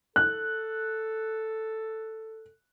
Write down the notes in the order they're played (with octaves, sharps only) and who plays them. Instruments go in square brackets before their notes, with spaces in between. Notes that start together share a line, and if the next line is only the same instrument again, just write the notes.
[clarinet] A4 [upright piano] F#6